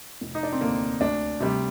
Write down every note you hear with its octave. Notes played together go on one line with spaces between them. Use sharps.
F1
D#4
D4
C4
D#2 D3 A#3
D2 D4
C3 G3